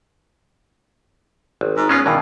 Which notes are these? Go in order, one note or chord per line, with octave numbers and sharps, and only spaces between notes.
G#1
G#2
G#3 B3 C#4 F4
G2 B2 D#3 E3